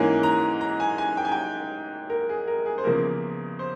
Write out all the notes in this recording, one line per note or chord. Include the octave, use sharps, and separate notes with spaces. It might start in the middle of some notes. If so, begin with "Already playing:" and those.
Already playing: G#2 E3 A#3 C#4 G#5
A#5
A#5
G#5
G#5
G5
G#5
G5
A#4
G#4
A#4
G#4
C5
E2 C#3 F3 A#3 A#4
C5